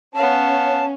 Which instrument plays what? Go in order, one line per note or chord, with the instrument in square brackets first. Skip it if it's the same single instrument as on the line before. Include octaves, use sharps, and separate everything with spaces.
[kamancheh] B3 F5 [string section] C#4 [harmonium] A5